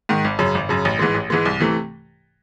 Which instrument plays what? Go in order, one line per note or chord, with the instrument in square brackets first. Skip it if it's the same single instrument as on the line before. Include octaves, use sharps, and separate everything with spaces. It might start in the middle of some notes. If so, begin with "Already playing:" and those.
[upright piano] G#2 D#3
G#1
F#2 C#3
G#1
F#2 C#3
A1
G#2 E3 G#3
A1
G#2 E3 G#3
C2
C3 E3 A3